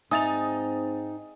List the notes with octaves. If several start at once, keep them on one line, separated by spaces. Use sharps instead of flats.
G#2 C4 D#4 E5 G#5 D#6 A6 F7